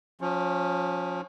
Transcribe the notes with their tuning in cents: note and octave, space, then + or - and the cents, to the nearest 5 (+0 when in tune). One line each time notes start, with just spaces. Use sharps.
F3 +30 C#4 +0